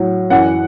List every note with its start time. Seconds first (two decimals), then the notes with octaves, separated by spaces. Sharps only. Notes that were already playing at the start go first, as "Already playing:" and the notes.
Already playing: A2 F#3
0.30 F#2 E3 F#5